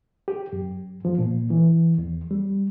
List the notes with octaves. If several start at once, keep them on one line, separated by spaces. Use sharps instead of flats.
G4
F#2
F3
A#2
E3
E2
G3